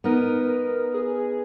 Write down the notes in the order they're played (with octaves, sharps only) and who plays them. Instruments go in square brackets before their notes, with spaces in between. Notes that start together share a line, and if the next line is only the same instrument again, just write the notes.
[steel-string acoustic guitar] B3 D#4 [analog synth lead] A#4
[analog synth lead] G#4